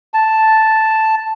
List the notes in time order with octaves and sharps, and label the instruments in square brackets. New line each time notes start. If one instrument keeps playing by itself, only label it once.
[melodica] A5